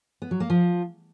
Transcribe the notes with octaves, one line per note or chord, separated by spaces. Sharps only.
B3
F#3
A#3
F3